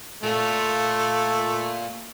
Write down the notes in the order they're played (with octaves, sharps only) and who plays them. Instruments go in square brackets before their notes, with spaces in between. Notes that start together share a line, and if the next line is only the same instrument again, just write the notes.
[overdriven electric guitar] A#2 F4 [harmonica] A3